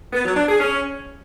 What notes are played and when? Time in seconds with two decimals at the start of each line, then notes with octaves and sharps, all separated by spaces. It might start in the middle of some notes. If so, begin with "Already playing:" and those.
0.13 B3
0.25 F#3
0.36 D4
0.48 G#4
0.59 C#4